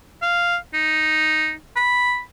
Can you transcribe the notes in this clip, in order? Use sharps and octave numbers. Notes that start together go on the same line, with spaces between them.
F5
D#4
B5